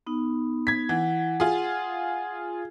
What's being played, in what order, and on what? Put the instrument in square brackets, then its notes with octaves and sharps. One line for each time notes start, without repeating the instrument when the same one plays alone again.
[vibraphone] B3 D#4
[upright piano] G#6 B6
[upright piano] E3 [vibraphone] F#5
[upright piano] F4 G#4